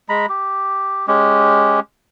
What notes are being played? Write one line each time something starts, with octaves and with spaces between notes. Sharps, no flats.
G#3 A#5 B5
G4
G#3 C#4 G4